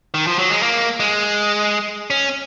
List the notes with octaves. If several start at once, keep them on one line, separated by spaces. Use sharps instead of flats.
D#3
F3
F#3
G#3
A#3
G#3
C#4